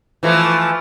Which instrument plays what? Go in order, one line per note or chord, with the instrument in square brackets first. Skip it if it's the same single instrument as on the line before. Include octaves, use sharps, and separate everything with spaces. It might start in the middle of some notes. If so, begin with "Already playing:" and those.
[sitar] E3 F3 A3